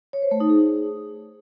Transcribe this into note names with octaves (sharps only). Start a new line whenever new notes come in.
C#5
C5
A3
D#4
G#4